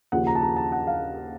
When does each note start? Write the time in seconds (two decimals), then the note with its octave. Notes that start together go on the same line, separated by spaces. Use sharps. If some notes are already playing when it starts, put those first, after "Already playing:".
0.12 D#2 C#3 F3 F#5
0.27 A#5
0.35 A5
0.42 A#5
0.56 A5
0.72 F#5
0.87 F5